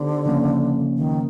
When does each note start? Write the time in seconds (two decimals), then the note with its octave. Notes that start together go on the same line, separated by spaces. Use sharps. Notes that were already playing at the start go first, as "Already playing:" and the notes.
Already playing: D3 B3 D#4 G4 C5
0.26 C#3 F3 A#3 C#4
0.97 D#3